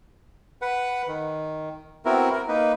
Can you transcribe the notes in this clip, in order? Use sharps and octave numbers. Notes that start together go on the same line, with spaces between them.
B4 F#5
D#3
B3 C4 E4 F#4 A#4
A#4
A#3 D#4 B4